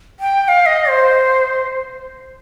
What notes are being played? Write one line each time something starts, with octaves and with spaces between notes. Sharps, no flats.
G5
G5
F5
D#5
C5